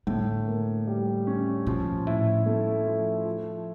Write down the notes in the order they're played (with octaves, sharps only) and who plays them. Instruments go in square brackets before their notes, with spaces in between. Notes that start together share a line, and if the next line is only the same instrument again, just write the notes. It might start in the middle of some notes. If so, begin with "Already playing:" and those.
[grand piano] A2 [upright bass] D3
[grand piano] A#3
G3
C#4
[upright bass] A#2 [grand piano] F3
[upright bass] A2 [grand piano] E4
[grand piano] A3
F3
F3